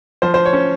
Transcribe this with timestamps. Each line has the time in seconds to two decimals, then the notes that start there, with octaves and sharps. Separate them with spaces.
0.22 F3 C5
0.34 C5
0.45 C#5
0.53 C#4